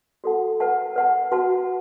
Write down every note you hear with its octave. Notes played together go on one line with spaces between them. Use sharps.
F#4 A4 F#5 A5
B4 F#5 A5
B4 F#5 A5
F#4 B4 F#5 A5